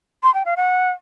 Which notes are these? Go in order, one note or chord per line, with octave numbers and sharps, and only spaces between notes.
C6
G5
F5
F#5